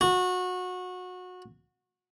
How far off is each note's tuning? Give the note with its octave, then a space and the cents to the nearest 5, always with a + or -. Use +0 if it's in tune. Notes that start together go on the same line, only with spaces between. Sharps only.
F#4 -25